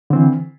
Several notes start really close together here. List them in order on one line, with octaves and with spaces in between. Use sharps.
D3 C4 E3